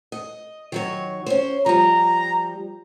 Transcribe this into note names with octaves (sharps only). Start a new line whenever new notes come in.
D#5
D#3 F#3 C#5
C#4 C5
F3 G3 A#5